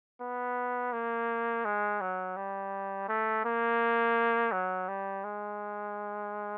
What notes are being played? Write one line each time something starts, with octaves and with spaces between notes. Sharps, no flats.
B3
A#3
G#3
F#3
G3
A3
A#3
F#3
G3
G#3